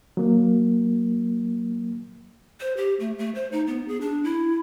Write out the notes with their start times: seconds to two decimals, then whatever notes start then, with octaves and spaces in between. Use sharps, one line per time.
0.17 F#3 A#3
2.60 C5
2.77 G4
3.00 A3
3.18 A3
3.35 C5
3.52 D#4
3.67 B3
3.88 G#4
4.01 D4
4.24 E4